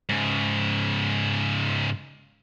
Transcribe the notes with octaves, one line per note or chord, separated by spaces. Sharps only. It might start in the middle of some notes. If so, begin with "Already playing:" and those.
G#2 C#3